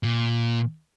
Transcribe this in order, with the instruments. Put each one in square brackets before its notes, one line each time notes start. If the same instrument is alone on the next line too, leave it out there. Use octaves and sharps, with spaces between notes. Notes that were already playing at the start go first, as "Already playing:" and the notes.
[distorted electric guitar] A#2